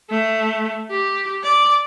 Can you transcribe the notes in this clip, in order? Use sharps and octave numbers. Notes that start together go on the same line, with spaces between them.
A3
G4
D5